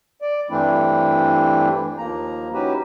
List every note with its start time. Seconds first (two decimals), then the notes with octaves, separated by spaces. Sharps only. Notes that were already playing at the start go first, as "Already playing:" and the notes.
0.22 D5
0.50 G2 E3 A3 C4 D4 E4
1.98 D#2 F3 A#3 A#5
2.53 C#4 D#4 E4 F#4 G4 B4